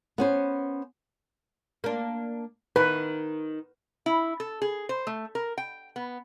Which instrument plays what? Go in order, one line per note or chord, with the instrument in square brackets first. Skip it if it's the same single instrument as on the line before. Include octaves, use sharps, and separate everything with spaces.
[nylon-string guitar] B3 C#4 C5
[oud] A#3 D4
[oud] D#3 [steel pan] B4
[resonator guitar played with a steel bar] E4
A4
G#4
C5
A3
A#4
G5
B3